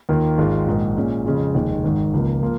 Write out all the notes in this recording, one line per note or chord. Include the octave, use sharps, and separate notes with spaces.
D#2 D#3 A#3 F4
G#1 G#2 G#3 F4
A#1 G#2 D#3 A#3
A#2 G#3 C#4
F2 C#3 G#3 F4
F1 D#2 D#3 G#3
G#1 G#2 D#3
C#2 C#3 F3 A#3
F3 A#3 F4